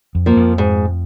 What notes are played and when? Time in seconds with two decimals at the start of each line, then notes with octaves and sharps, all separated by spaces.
0.15 F2
0.26 F3 A#3
0.37 F2
0.58 G#2